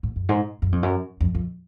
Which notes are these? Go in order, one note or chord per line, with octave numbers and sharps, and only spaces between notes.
G#2
F#2
G#2
F#2
F2
F#2
F2
F2